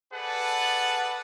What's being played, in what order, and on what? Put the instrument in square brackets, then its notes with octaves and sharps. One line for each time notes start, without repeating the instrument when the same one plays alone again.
[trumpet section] G#4 A4 B4 D5 F#5 A5